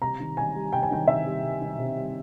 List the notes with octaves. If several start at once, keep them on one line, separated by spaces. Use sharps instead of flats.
C3 A#5
D#3
C3 G#5
G3
C3 G5
G#5
D#3 G5
C3 E5
G3
C3
D#3
C3
G3